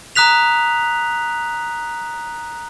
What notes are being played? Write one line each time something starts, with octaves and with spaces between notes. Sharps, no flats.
A#5 D#6 F#6 B6 F7